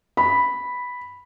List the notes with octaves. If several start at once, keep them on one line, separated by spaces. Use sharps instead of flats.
B5